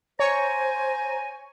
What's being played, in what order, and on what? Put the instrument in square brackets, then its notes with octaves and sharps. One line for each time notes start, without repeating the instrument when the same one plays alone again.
[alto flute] C5 [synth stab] C#5 C#6 [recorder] G#5 [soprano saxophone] A#5